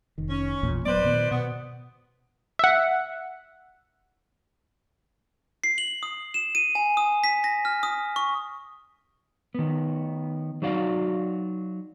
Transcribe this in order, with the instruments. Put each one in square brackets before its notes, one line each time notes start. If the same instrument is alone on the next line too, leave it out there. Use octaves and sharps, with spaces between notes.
[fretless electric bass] F1 D#3
[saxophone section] C#4
[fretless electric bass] A1 E2 A#2
[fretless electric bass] D#1 F#3 B3 [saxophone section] B4 C5 D5
[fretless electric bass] A#2 D#3 B3
[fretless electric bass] B2 [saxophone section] B3
[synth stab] E5 F#5
[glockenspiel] C7
F#7
D#6
E7
D#7
G#5
D#6
B6
A#6
F6
D#6
C#6
[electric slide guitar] D#3 B3
F#3 D#4 F#4 D5 F5